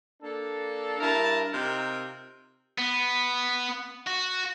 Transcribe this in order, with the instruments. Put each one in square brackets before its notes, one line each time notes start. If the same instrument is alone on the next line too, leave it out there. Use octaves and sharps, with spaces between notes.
[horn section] A#3 D4 A4
G2 E4 A#4 A5
C3 D#4 F4 A#4 G5
[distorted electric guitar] B3
F#4